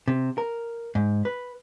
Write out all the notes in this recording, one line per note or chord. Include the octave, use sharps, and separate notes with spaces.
C3
A#4
G#2
B4